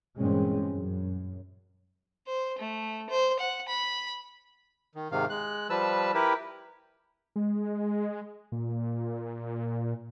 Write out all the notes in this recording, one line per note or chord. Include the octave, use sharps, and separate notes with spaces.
G2 A#2 E3 G#3 C4 C#4
F#2
C5
A3
C5
F#5
B5
D#3
G#2 C3 D#3 F5
G#3 F#6
F3 G3 B4 A5 E6
E4 G4 A#4 B4
G#3
A#2